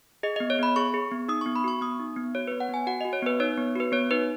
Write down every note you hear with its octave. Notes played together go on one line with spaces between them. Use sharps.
G#4 D#5
D#5
B3
C#5
B3 B5
G#4 C#6
G#4
B3
D#4 D#6
C#6
B3
B5
F#4 C#6
B3 D#6
D#4
B3
F#4 C#5
B4
B3
F#5
B3 G#5
F#4 F#5
D#5
F#4
C#5
B3 B4
D#4 C#5
B3
F#4 B4
B3 C#5
D#4 B4